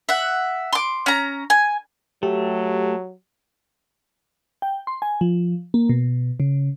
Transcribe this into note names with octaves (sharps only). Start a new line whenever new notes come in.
E5 F#5
C6 D6
C#4 A#5
G#5
F#3 A3 G4
G5
C6
G#5
F3
A#3
B2
C#3